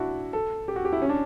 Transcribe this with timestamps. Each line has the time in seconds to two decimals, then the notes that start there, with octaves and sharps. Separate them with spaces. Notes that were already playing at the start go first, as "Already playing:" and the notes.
Already playing: D4 E4 F#4
0.33 A4
0.68 G4
0.76 F#4
0.85 G4
0.93 E4
1.02 C#4
1.09 D4